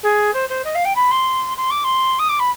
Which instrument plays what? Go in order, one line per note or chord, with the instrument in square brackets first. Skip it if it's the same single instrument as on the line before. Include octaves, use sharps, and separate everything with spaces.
[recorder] G#4
C5
C5
D#5
F5
G5
B5
C6
C6
D6
C6
D#6
D6
B5